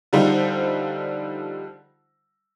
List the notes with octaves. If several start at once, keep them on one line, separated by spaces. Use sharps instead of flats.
D3 F3 G3 D#4 F4 C5